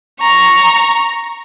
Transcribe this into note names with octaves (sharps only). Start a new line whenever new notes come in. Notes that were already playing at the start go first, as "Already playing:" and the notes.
A#5 C#6